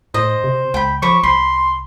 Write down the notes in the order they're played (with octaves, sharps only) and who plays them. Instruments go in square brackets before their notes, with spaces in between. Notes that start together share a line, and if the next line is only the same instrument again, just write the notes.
[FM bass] A2 [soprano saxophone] C5 [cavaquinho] D#5
[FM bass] C3
[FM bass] C#2 [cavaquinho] G5 B5
[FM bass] F3 [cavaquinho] C5 B5 D6 [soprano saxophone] C#6
[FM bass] C2 [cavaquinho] B5 [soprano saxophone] C6